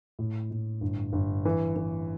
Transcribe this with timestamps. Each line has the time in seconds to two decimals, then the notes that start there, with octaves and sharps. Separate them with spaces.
0.19 A2
0.51 A2
0.81 G1
1.13 G1
1.45 E3
1.76 E3